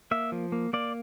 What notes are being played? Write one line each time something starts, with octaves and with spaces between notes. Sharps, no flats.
A#3 E5
F3
A#3
A#3 D5